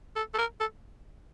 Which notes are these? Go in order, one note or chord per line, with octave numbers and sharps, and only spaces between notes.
A4
A4
A#4
A4